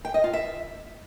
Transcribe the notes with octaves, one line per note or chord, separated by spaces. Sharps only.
G5
D#5
F4
E5